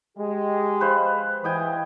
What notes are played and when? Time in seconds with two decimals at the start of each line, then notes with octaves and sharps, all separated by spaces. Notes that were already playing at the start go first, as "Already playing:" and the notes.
0.18 G#3 G4
0.81 B4 C5 F5
1.44 E3 D#5 G5 G#5